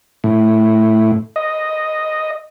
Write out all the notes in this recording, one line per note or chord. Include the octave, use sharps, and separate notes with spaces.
A2
D#5